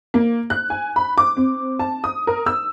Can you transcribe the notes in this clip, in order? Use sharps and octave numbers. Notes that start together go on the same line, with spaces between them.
A#3
F#6
G#5
B5
D6
C4
A5
D#6
A#4
E6